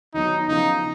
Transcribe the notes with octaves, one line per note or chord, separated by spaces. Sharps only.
D#3 F#3 B3 D#4 F#4
C#3 F3 B3 D#4 F4